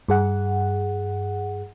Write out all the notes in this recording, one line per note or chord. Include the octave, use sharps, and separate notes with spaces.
G2 G#4 F#5